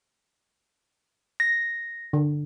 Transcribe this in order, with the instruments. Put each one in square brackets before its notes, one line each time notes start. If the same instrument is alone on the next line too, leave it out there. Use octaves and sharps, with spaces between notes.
[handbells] A#6
[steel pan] D3